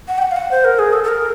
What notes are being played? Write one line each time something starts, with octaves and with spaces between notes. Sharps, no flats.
F#5
G5
F#5
F5
F#5
C5
A#4
G#4
A4
A4
A#4